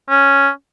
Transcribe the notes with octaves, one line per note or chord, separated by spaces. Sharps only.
C#4